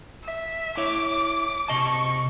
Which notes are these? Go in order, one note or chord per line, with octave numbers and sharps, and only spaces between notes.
E5
E4 C#5 E5 D6
C3 D#5 A5 C#6